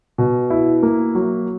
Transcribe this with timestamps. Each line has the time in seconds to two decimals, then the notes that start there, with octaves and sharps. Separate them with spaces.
0.18 B2
0.50 E4
0.83 A#3
1.15 F#3